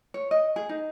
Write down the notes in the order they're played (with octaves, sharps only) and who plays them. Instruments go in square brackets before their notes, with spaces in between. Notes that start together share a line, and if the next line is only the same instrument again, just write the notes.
[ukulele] C#5
D#5
G#4
D#4